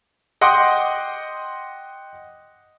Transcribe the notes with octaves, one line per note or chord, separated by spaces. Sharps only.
D#5 F#5 G5 C6 D6 D#6